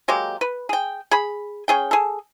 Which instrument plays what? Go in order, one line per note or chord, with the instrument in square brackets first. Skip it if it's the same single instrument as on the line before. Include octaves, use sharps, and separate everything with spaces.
[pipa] F#3 G#3 A#3 G4
B4
G#4 G5
G#4 B5
C#4 G#4 G5
G#4 A4